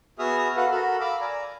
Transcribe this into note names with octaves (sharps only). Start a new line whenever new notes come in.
B3 F#4 G#4 E5 D#6 F6
F#4 A4 B4 F5 F#5
F#4 A4 A#4 A5 B5
F5 B5 D6 E6
D5 G#5 A#5